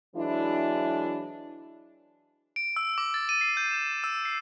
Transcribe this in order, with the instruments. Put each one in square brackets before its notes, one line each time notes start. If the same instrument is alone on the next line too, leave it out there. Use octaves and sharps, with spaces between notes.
[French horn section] E3 F#3 G#3 D4 E4
[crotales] D7
E6
D6
A6
D#7
C7
G6
E7
E6
C7